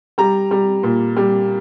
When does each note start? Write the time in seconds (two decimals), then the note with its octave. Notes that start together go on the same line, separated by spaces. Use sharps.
0.18 G3 A#5
0.51 G3
0.83 A#2
1.17 G3